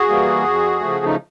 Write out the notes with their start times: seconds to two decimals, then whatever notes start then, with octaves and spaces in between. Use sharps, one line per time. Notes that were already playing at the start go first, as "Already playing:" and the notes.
Already playing: F#4 G#4
0.09 E3 G3 A#3
0.45 F2
0.80 C#3 F3 A3
1.06 D#4